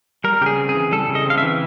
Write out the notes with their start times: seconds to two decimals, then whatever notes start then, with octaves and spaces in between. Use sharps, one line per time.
0.24 G3 A#4
0.41 C#3 G4
0.46 G#4
0.58 C4
0.69 G#4
0.75 E3
0.92 G3 A4
1.09 C#3
1.15 D#5
1.26 C4 F5
1.38 E5
1.43 E3